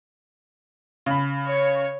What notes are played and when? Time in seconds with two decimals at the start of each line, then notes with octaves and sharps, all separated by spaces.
1.06 C#3 B5
1.46 C#5